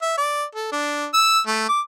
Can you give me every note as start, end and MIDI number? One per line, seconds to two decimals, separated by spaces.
0.02 0.17 76
0.18 0.44 74
0.55 0.68 69
0.72 1.06 62
1.14 1.41 88
1.47 1.68 57
1.68 1.81 86